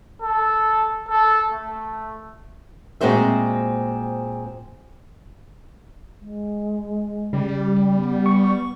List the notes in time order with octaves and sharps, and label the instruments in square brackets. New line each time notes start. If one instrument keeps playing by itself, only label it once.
[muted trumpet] A4
A4
A3
[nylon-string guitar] A#2 G#3 C4 F#4 C5 E5
[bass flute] G#3
[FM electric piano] C#3 [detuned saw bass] G3
[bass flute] B3
[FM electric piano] C#6